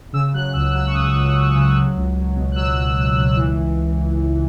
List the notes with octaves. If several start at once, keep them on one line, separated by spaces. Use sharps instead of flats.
C#3 E6
F#3 F#6
C#2 E6
F#3 E6
C#6
C#2 D#6
C#2
C#3
C#3
F#3
C#2
F#3
B2
F#6
F#3 E6
C#2
C#2
C#2
E3